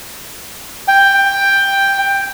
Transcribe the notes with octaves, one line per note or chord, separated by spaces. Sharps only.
G5